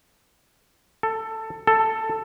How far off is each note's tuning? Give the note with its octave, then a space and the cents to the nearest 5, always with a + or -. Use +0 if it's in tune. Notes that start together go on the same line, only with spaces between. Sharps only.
A4 +15
A4 +10